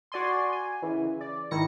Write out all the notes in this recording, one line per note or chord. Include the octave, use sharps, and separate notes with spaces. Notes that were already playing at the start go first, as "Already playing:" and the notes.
F#4 D5 G#5 C6
G#5
C#3 E3
D5
G#1 D#3 E4 A#6 C#7